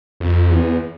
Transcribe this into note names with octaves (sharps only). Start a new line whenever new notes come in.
F2
E2